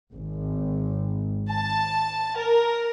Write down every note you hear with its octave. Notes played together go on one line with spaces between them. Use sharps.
G#1
A5
A#4